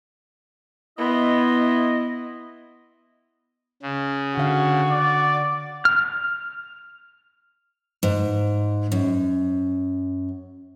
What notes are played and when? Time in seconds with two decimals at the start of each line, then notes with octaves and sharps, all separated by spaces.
0.98 B3 E4 D#5 C6
3.83 C#3
4.37 D3 F#4 F5
4.90 D5
5.85 F6
8.03 G#2
8.92 F#2